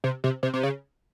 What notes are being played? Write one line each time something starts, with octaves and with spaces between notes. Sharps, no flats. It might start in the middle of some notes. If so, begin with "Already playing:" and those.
C3
C3
C3
C3
C#3